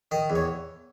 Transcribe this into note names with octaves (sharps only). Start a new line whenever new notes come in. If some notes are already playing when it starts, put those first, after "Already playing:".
D#3 D#5
E2
C#5